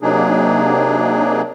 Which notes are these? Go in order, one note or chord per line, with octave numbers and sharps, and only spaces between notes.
C3 F#3 A#3 D4 D#4 G#4